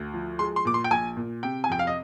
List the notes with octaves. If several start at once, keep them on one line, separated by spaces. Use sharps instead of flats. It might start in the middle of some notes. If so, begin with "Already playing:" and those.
Already playing: D2
F3
G#3 C6
C6
A#2 D6
C6
G5
A#1 G#5
A#2
C3 G5
G#5
F2 G5
F5
D#5